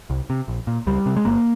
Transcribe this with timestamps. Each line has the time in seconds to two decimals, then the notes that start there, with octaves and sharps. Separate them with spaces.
0.10 C2
0.30 C3
0.48 A#1
0.67 A#2
0.87 C#2 G3
1.06 C3
1.16 G#3
1.25 G1 A#3